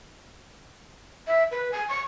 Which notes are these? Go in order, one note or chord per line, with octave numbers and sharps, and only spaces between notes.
E5
B4
G#5
C#6